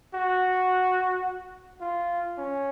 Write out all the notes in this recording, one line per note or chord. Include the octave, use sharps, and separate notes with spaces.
F#4
F4
C#4